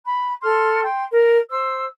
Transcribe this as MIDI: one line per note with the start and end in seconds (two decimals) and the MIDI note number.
0.05 0.32 83
0.42 0.84 69
0.42 0.84 84
0.42 0.84 89
0.84 1.03 79
0.84 1.03 84
1.11 1.37 70
1.50 1.84 72
1.50 1.84 88